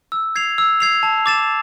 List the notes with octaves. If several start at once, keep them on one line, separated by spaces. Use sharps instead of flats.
E6
G#6 C7 F7
E6
G#6 C7 F7
A5
D6 A6 E7